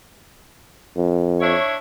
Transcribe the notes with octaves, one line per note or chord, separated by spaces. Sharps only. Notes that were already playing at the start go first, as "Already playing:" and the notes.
F2
D4 E4 C#5